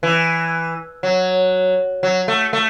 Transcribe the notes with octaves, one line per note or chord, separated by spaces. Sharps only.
E3
F#3
F#3
A3
A3